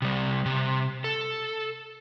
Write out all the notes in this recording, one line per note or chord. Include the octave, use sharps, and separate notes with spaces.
C3 G3
C3
A4